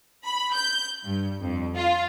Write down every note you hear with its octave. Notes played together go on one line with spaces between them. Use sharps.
B5
G6
G2
F2
F4